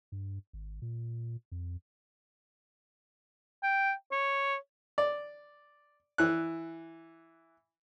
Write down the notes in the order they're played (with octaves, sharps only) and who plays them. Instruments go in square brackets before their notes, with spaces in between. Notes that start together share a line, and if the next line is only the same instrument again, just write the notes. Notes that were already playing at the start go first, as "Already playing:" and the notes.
[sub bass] G2
G#1
A#2
F2
[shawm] G5
C#5
[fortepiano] D5
E3 F#6